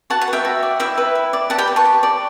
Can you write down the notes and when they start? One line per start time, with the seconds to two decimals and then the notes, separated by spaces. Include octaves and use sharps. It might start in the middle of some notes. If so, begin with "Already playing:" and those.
0.10 F#4 F#5 A5
0.21 F#5
0.28 B4
0.33 E5 G5
0.45 F#4
0.63 D5
0.80 E4 E5 G5
0.98 B4
1.15 E4
1.33 D5
1.50 G4 F#5 A5
1.58 G5 B5
1.68 B4
1.76 A5 C#6
1.85 G4
2.03 D5